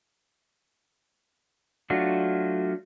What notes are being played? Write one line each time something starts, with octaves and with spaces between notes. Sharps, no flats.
F#3 A3 D4 F4 F#4